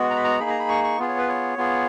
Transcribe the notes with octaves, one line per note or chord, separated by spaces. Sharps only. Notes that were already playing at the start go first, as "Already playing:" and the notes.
Already playing: G#3 B3 F#4
A#5
B5
A#5
A#3 D#4 G#4 B5
A#5
B5
C#6
C#6
B3 F4 G#4
C#5
B4
C#5
B3 F4 G#4